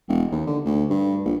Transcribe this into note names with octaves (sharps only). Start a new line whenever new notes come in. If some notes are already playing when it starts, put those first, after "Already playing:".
E1
D#2
D3
D2
G2
A#1